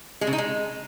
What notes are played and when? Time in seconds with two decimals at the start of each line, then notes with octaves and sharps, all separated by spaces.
0.21 G#3
0.27 C#3
0.33 D#4
0.38 G#3